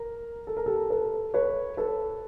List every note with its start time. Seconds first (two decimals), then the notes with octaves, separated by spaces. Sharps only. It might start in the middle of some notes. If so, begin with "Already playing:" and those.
Already playing: A#4
0.47 A4
0.57 A#4
0.66 G4 A4
0.90 A4 B4
1.34 B4 C#5
1.77 A4 B4